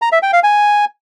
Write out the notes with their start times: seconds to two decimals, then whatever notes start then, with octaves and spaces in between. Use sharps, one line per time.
0.02 A#5
0.12 E5
0.23 G5
0.33 F5
0.43 G#5